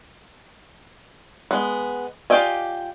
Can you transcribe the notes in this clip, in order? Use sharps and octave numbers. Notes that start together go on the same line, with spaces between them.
G#3 B3
F4 G4 D5 D#5 G#5